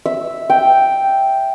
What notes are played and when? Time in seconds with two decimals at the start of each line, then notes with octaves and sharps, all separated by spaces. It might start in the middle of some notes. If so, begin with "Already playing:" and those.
0.06 E5
0.50 G5